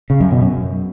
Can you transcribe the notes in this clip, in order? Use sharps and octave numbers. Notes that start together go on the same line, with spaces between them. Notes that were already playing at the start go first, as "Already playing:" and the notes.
C#3
F#2
B2
F#2